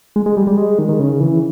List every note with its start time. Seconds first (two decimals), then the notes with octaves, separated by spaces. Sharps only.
0.16 G#3
0.26 G#3
0.37 G3
0.47 G3
0.58 G#3
0.79 D#3
0.89 D#3
0.99 C#3
1.20 E3